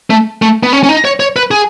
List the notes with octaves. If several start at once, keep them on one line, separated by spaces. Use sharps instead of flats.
A3
A3
B3
C#4
C#4
D#4
C#5
C#5
B4
G#4